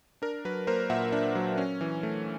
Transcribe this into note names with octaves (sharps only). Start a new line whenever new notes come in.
D4 A#4
F#3 B4
A#3 A#4 C5
A#2 E5 F#5
D4
F#3
C#4
E3
A3